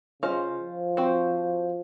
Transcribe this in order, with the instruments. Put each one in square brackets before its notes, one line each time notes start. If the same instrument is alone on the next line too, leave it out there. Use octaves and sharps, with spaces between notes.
[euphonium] C#3 [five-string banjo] C#4 F4 C5 D#5
[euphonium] F3
[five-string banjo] C4 F#4 C5